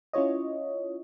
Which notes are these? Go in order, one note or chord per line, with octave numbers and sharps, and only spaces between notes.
C#4 E4 F4 C#5 D#5